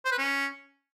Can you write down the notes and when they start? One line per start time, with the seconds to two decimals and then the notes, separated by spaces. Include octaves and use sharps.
0.05 C5
0.12 B4
0.18 C#4